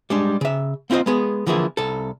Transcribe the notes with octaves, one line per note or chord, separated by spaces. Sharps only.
G3 G#3 D4
C#3 E5
A#3 C4 E4 F4 C5 D#5
G#3 B3 G#4
D3 E3 F3 A#3 E4 G#4
C2 A4